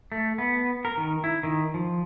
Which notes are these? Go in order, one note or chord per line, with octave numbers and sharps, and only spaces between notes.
A3
B3
A#4
D#3
E4
D#3
F3